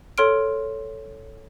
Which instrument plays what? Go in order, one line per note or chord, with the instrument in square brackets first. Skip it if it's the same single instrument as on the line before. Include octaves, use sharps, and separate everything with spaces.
[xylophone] A4 C#5 C6 F6 D7